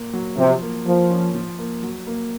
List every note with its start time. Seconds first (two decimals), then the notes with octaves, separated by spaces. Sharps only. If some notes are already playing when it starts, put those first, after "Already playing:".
Already playing: A#2 A#3
0.13 F#3
0.38 C3 F3
0.62 A#3
0.86 F3 A#3
1.10 C#4
1.35 F3
1.59 A#3
1.83 F#3
2.07 A#3